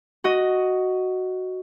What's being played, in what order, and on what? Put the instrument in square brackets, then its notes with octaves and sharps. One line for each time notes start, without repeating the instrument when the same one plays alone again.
[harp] F#4 D#5